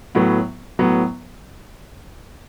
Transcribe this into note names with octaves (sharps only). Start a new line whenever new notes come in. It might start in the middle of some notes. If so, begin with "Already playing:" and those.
A2 F#3 B3
A2 F#3 B3